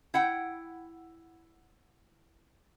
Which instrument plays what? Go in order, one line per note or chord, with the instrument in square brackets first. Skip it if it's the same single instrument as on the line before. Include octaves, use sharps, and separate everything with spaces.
[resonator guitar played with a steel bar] E4 F#5 G5